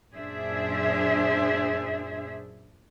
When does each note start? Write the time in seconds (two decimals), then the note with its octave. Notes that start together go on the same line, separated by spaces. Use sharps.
0.15 F#2 A#2 D4 G#4 C5 E5